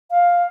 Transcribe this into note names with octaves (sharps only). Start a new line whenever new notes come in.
F5